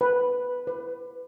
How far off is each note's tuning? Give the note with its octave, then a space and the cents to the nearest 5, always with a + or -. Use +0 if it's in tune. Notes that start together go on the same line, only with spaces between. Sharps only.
B4 +0
B4 +25